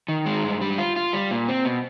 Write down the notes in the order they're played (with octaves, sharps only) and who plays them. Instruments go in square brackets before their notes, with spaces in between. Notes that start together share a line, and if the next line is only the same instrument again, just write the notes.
[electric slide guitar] D#3
G#3
G2
G3
F4
F4
G3
A#2
C4
B2